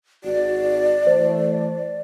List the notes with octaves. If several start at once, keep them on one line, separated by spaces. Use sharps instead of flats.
G#1 F#4 D5
E3 A3 C5